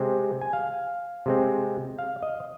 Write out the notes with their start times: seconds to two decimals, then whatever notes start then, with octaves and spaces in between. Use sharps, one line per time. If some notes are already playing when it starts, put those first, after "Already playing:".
Already playing: C3 G#3 C4
0.41 G#5
0.53 F5
1.26 C3 G#3 C4
1.99 F5
2.23 D#5